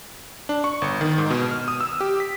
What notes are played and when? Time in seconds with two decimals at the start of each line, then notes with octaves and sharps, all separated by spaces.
0.49 D4
0.64 C#6
0.82 G1
1.01 D#3
1.18 G#2
1.30 B2
1.51 F6
1.68 D#6
1.81 E6
2.00 G4
2.20 B6